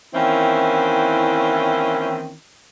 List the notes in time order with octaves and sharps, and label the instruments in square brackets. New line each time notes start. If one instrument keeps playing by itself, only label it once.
[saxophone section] D#3 E3 A#3 C4 C#4 E4